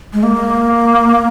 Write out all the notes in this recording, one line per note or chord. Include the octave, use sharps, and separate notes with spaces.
G#3
A#3